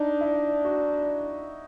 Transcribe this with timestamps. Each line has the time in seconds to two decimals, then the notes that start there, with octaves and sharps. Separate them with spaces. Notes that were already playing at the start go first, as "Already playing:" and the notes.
Already playing: D4 D#4
0.21 E4
0.65 F#4